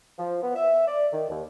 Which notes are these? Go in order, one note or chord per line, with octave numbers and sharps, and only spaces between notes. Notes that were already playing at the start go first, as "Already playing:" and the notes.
F3
B3
E5
D5
D#3
D#2